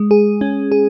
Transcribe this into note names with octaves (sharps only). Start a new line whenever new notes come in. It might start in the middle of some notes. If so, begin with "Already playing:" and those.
Already playing: G#3
G#4
C#4
G#4